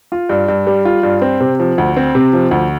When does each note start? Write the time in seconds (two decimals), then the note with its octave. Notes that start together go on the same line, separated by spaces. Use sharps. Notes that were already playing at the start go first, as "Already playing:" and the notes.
0.12 F4
0.29 G2
0.48 G2
0.67 G3
0.85 F4
1.03 G2
1.22 C4
1.40 C3
1.60 F3
1.78 D2
1.96 C4
2.15 C3
2.33 F3
2.51 D2